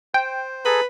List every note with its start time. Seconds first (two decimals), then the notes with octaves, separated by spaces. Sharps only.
0.14 C5 G5
0.65 G#4 A4 B4 A#5